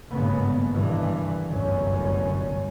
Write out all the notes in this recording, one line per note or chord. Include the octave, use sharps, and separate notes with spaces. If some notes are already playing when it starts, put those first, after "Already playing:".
G#1 G2 C#3 A#3 B3
G1 G2 C3 D#3 E3
G1 C2 F#2 A2 C#4